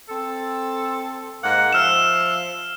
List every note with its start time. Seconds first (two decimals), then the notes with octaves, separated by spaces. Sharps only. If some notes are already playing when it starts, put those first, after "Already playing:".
0.09 C4 A4
1.42 G#2 A#3 F#5
1.73 F3 E5 F5 F6 E7